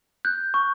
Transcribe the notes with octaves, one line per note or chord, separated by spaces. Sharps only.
F#6 G6
C#6